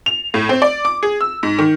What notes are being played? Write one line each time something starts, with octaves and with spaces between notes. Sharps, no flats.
F7
A2
C4
D5
D6
G#4
E6
G#2
D#3